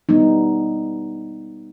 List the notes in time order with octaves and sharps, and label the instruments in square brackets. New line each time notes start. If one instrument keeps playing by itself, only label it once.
[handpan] G3 B3 D#4